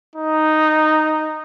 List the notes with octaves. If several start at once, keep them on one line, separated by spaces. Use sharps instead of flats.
D#4